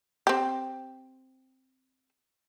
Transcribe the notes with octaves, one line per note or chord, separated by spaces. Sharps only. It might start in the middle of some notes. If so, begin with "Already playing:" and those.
C4 G4